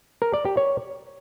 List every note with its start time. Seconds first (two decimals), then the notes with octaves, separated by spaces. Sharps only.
0.22 A#4
0.33 D5
0.45 G4
0.57 C#5